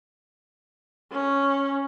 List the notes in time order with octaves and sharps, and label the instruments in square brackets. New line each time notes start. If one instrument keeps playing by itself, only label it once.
[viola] C#4